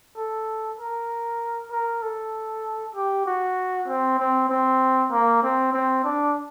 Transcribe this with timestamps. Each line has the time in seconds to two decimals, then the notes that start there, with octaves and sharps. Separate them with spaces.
0.17 A4
0.79 A#4
1.71 A#4
2.02 A4
2.95 G4
3.26 F#4
3.88 C4
4.19 C4
4.49 C4
5.11 A#3
5.43 C4
5.73 C4
6.04 D4